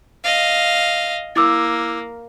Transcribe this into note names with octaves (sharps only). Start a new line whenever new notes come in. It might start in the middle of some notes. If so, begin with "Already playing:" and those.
D#5 F5
A#3 E4 D6 E6